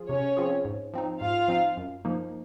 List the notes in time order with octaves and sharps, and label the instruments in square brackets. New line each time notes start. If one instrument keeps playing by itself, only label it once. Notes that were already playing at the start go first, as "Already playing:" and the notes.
Already playing: [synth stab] F3 F4 G#4
[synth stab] C3 [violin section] C#4 C#5
[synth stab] F3 C4 F4 G#4
G#2
F3 C4 D#4
[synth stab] G#2 [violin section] F4 F5
[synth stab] F3 C4 D#4
F#2
F3 A#3 D#4